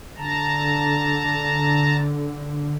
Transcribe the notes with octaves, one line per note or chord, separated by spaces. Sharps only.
D3 A5 A#5